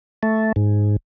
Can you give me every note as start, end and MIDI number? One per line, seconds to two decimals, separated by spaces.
0.23 0.52 57
0.56 0.96 44